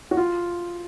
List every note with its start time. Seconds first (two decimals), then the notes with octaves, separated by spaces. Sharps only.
0.11 F#4
0.17 F4